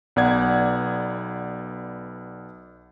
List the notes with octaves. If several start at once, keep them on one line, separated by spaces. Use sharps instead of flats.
B1 B3 D5 F#5 G#6